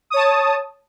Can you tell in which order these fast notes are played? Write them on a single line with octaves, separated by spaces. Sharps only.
D#6 C#5 A5